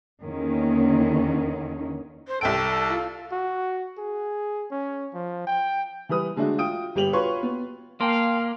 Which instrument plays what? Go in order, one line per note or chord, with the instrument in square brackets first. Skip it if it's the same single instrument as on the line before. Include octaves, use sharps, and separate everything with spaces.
[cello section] E2 D3 D#3 A#3 C#4
[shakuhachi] C5
[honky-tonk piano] C2 G5 D7 [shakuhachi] A4
[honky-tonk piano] F4
[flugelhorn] F#4
G#4
C#4
F3
G5
[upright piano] E3 G3 B4 D#6
D3 G#3 A3 D4 F#4
F4 G5 D#6 D7
G1 G3 G4 G5 F7 F#7
F4 F#4 B4 C#5 C6 C#6
B3
[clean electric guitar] A#3 [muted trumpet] F5 [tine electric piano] G5 A5 C6